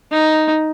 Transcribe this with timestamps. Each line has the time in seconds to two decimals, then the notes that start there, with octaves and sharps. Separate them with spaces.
0.11 D#4